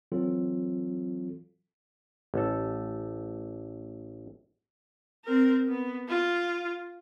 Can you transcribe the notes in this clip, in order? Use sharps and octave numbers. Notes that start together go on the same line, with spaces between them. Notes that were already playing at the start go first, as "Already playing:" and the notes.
E3 F#3 C4 F4 A4
A1 A4
C4 A#4
B3
F4